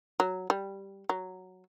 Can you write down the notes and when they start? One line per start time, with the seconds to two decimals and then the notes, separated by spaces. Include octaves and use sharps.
0.20 F#3
0.50 G3
1.09 F#3